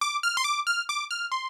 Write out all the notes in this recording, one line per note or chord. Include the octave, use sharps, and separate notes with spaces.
D6
F6
C6
D6
F6
D6
F6
C6